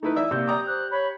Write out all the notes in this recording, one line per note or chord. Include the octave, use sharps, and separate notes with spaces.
A3 D#4 E4 B4
E3 D5 E5 E6
C3 A#3 G4 G6
D5 A#5 D6 D#6
C5 F#6
C#5 B5